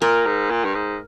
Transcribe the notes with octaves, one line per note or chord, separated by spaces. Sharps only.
A#2 A#4
G#2
A#2
G2
G#2